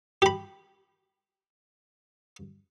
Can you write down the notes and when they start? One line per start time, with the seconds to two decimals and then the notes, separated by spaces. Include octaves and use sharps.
0.22 G4 B5